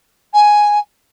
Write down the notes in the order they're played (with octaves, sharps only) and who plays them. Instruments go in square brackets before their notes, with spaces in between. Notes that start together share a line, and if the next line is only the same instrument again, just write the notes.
[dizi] G#5